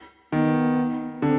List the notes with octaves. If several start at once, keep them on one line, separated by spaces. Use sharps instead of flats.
D#3 B3
D3 C4